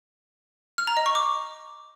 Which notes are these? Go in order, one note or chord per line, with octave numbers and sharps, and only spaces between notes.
F6
A#5
D#5
C#6
D6